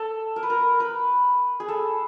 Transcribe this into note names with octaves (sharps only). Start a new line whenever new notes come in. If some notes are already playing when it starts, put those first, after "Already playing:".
Already playing: A4
A#4
B4
A#4
B4
G#4
A4